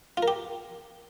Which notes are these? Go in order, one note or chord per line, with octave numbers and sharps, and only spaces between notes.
F4
A#4
G4